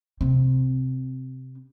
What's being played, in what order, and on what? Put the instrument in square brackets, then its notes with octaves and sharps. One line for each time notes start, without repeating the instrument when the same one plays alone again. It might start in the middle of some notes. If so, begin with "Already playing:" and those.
[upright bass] C3 C4